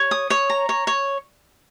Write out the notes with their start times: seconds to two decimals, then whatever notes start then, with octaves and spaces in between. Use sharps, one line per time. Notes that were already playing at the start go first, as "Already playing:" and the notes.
Already playing: C#5
0.11 D#6
0.30 C#5
0.50 A#5
0.69 C#5
0.87 C#5